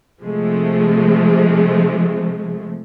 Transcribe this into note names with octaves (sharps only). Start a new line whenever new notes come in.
C3 F3 G#3 A3